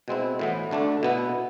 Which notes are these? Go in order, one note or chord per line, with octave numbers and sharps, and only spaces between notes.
B2 G#3 C4 E4
A2 E3 B3
D2 D3 A3 D4
B2 B3 E4